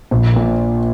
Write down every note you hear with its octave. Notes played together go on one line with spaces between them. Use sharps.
A#1
A#2